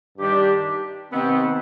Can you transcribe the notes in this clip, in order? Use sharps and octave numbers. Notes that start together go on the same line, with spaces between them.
G2 D#3 G3 D4 G4
C3 D#3 B3 C4